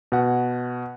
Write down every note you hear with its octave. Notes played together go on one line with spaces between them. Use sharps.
B2 F#5